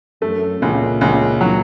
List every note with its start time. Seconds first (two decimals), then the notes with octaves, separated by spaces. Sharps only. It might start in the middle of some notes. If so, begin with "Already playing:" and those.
0.22 F#2 A3
0.61 C#2 A#2
1.01 C#2
1.41 F#3